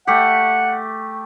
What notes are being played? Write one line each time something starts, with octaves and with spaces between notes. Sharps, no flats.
A3 G4 F#5